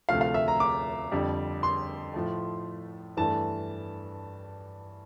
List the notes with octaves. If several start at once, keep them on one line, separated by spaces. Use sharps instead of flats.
D2 C3 F3 A3 F5
F5
E5
A#5
D6
F2 D3 G3
C6
A2 F3 A3
G2 E3 A3 A5